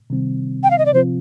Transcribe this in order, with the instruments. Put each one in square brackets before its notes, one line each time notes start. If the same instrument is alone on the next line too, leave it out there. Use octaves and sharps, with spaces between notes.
[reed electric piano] C3 D#3 G3 C4
[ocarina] G5
F5
D#5
D5
[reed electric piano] C3 F3 C4 F4 [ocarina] C5